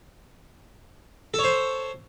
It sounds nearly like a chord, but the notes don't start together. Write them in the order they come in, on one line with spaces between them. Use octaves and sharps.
A4 C#5 C5